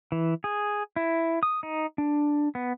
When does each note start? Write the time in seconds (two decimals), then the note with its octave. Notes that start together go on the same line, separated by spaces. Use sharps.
0.12 E3
0.44 G#4
0.96 E4
1.43 D#6
1.63 D#4
1.98 D4
2.55 B3